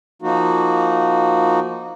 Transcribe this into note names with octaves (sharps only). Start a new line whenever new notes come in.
F3 A#3 D#4 F#4